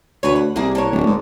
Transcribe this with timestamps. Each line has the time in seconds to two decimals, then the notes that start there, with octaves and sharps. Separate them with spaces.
0.23 D2 B4 C#5
0.36 F#5
0.56 C2 A#3 G#4
0.75 A#3 D4 C#5
0.92 D1
1.06 G#2